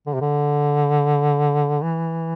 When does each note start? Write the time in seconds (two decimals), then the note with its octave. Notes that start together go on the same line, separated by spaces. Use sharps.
0.06 D3
0.14 C3
0.21 D3
1.82 E3